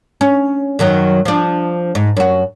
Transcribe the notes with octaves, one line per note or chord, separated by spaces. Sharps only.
C#4
F#2 D#3 F#3
F3 D4
G#2
F#2 F#4